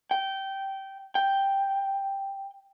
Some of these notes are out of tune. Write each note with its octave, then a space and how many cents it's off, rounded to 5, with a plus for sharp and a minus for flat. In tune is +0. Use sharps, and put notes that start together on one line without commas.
G5 -15
G5 +0